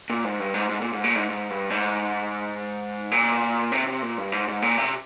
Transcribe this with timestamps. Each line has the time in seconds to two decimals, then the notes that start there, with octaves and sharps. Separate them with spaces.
0.10 A#2
0.24 G#2
0.40 G2
0.54 G#2
0.69 G#2
0.81 A#2
0.93 G#2
1.04 A#2
1.16 G#2
1.30 G#2
1.50 G2
1.70 G#2
3.11 A#2
3.72 C3
3.87 C3
4.02 A#2
4.18 G2
4.32 G#2
4.48 G#2
4.62 A#2
4.78 C3